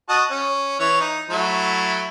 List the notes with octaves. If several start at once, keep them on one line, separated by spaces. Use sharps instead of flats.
F#4 D#5 A5
C#4
E3 C#5
D#4
F#3 A3 E4